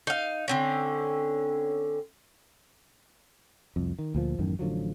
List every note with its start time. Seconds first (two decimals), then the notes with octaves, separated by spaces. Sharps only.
0.07 D#4 F5
0.48 D3 C4 C#4
3.76 C2 F2
3.99 D#3
4.15 D2 A#2 F3
4.39 A1 F#2 D#3
4.59 A1 D3 F3 F#3